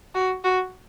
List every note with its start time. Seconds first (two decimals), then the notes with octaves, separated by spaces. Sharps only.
0.15 F#4
0.44 F#4